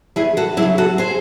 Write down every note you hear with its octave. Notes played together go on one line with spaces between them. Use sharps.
E2 E4 G#4
F#4 A4
F#3 E4 G#4
C#3
F#4 A4
G#4 C5